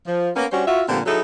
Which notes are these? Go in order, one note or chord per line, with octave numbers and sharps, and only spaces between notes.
F3
A#3 B3 C#4
G3 C#4 D4 F#4 C5 C#5
F4 F#4 E5
A#2 D3 F3 G3 B3 C4
F#3 D#4 E4 G#4 A4